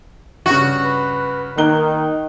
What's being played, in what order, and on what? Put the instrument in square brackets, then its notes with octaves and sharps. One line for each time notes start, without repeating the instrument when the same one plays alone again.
[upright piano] G2 C#3 [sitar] F#4
[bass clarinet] B4
[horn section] D#3 [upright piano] A#3 F#6 G7 [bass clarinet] D#4